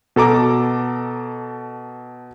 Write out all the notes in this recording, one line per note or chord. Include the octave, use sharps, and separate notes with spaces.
B2 A4 A#5 D6